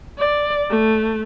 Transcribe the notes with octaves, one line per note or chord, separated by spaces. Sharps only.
D5
A3